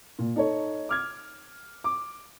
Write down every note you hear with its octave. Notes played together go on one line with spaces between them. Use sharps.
A#2
D#4 A4 C#5
D6 F6 G#6
D6